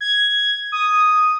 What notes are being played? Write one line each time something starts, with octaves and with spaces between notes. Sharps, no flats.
G#6
D#6